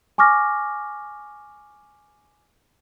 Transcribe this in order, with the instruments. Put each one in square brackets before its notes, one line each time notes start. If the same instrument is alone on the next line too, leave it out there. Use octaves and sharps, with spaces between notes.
[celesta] G#5 C#6 D6 F6 A#6